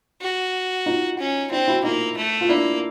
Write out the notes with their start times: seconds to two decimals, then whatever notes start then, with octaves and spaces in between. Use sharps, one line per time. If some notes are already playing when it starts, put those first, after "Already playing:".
0.21 F#4
0.86 D#4 F4
1.18 C#4
1.51 C4 D4 E4
1.68 E4 F#4
1.84 A#3 D#4 F4
2.17 A3
2.41 F4
2.49 A#3 D4 E4